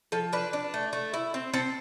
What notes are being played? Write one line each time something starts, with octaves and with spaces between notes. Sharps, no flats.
F3 A4
D4 B4
D4
A3
A3
E4
C4
C4 A4